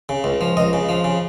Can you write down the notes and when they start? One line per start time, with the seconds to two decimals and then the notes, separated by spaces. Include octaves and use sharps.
0.09 C#3
0.24 C#2
0.41 F3
0.57 C#2 D#5
0.73 C#3
0.89 F3
1.04 C#3